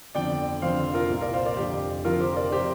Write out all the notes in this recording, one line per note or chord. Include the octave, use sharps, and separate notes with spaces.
G1 F2 D3 D5 G5
F1 F2 D3 C5 F5
F4 A#4
C2 A#2
A#4 D5
C5 F5
A#4 D5
F1 F2 D3 G4
F1 F2 D3 F4 A#4
G4 C5
A#4 D5
C3 G4 C5